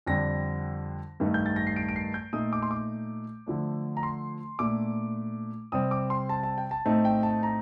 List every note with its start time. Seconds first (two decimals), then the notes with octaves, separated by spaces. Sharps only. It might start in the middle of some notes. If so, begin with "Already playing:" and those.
0.06 F2 D3 G3 D4 A#6
1.20 G2 D#3 A3 D#4
1.34 G6
1.46 A6
1.56 A#6
1.67 C7
1.76 D7
1.89 D7
1.96 C7
2.14 G6
2.33 A#2 A3 D#4 D#6
2.53 D6
2.63 C6
2.71 D6
3.46 D3 F3 A3 D4
3.97 A#5
4.03 C6
4.59 A#2 A3 D4 D6
5.72 C3 G3 C4 D#6
5.91 D6
6.10 C6
6.29 A5
6.43 A5
6.58 G5
6.71 A5
6.85 A2 A3 C4 D#4 A5
7.05 G5
7.23 A5
7.43 A#5